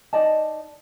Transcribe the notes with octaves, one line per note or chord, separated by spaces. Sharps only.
D#4 D5 D#5 A5